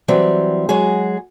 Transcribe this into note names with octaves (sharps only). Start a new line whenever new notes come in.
E3 F#3 G3 C4
F#3 G#3 F#4 G#4